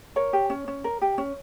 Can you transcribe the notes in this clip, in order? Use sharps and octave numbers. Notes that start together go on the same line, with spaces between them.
A#4 C#5
G4
C#4
C#4
A#4
G4
C#4